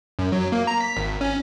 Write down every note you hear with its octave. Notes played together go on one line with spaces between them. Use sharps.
F#2
F#3
A#3
A#5
B6
G#1
C#4